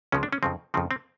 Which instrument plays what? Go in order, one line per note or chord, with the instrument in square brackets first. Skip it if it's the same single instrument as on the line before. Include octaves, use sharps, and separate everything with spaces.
[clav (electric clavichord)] C#2 C#3 F3 G#3 C#4
D4
C#4
F2 C#3 F3 C4
F2 C#3 F3 C4
C4